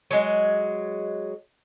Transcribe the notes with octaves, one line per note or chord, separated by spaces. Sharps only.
F#3 G#3